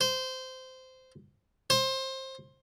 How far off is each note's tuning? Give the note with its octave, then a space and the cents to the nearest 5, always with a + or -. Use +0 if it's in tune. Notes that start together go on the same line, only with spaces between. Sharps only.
C5 -15
C5 +20